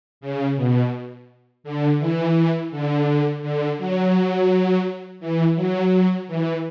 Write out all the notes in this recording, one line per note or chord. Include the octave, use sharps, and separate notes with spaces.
C#3
B2
D3
E3
D3
D3
F#3
E3
F#3
E3